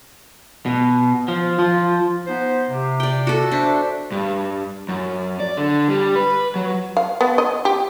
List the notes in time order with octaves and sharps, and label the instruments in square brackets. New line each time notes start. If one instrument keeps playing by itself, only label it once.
[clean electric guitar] B2
F3
[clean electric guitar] F3 [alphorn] F4
[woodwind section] B3 D#4 C5
C3
[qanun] D5 G5
F#4 A4
[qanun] D4 [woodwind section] C5 E5
[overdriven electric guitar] G2
F#2
D5
D3
G3
B4
F#3
[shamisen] F5
B3
D#5
G4